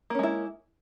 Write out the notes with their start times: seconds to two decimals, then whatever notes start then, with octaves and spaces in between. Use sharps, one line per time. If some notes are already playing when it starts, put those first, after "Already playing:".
0.10 A#3
0.15 C#4
0.19 G#3
0.23 E4